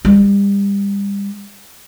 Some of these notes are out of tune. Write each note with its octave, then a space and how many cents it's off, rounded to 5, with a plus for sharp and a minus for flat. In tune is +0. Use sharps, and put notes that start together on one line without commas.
G3 +35